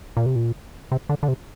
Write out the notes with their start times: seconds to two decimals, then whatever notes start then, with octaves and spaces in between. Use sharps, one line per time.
0.17 A#2
0.26 C3
0.36 A#2
0.92 C3
1.09 D3
1.23 D3
1.28 C3